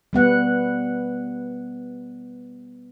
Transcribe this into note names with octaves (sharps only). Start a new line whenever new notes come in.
G3 B3 F#5